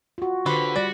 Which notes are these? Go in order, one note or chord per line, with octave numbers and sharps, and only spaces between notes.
F4 F#4
D3 G4 B4 C5 B5
G3 F#4 D5